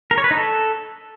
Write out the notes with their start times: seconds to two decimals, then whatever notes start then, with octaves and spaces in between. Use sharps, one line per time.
0.11 A#4
0.18 C#5
0.24 B4
0.31 D#4
0.37 A4